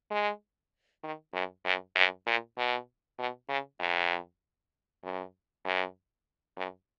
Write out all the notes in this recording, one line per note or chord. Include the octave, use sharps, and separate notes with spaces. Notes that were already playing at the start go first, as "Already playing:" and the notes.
G#3
D#3
F#2
F#2
F#2
A#2
B2
B2
C#3
F2
F#2
F#2
F#2